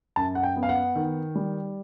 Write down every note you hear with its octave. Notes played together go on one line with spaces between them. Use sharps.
F#2 A5
F#5
G5
B3
F5
F#5
D#3
G3